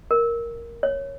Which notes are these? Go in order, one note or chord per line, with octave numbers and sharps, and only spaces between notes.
A#4
C#5